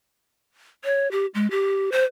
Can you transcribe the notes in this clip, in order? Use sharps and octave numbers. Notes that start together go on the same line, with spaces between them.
C#5
G4
G#3
G4
C5